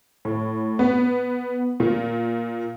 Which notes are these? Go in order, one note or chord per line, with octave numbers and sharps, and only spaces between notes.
A2
B3
A#2